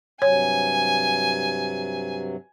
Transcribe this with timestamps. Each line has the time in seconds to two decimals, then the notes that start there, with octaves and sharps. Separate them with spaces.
0.22 G2 C3 F#3 C#5 G#5